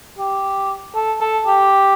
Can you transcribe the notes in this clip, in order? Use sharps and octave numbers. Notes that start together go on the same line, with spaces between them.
G4
A4
A4
G4